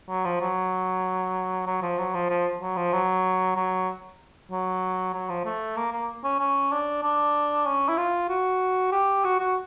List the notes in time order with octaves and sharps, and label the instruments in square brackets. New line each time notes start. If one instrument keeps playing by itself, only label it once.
[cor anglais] F#3
F3
F#3
F#3
F3
F#3
F3
F3
F#3
F3
F#3
F#3
F#3
F#3
F3
A3
A#3
A#3
C#4
C#4
D4
D4
C#4
E4
F4
F#4
G4
F#4
F#4